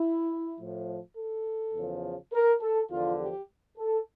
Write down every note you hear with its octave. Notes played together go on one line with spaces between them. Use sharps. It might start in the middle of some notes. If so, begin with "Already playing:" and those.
Already playing: E4
A2 F3
A4
E2 C#3 F3
A#4
A4
E2 D3 F3 F4
G4
A4